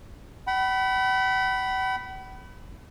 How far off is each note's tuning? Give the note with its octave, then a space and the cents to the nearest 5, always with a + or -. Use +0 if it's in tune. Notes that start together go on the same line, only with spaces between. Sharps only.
F#5 +45 B5 +0